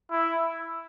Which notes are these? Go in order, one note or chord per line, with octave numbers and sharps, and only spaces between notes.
E4